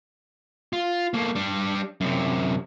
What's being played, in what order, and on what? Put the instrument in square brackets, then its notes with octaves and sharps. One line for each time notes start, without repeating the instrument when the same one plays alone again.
[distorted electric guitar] F4
A3 A#3
G3 D4
F#2 C3